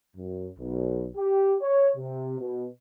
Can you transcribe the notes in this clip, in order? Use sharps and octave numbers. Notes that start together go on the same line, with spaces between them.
F#2
B1
G4
C#5
C3
B2